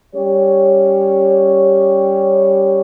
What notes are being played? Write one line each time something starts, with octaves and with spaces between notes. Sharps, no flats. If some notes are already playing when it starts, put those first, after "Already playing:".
G3 C#4 G4 C#5